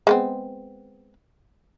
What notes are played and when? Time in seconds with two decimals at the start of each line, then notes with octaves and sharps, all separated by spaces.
0.07 G#3 B3 C4